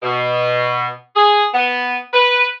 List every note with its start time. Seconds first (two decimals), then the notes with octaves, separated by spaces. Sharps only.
0.03 B2
1.16 G#4
1.53 B3
2.13 B4